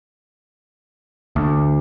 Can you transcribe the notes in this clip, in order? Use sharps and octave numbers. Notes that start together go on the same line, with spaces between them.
D2